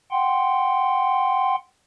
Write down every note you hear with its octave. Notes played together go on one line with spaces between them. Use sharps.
F#5 G5 C6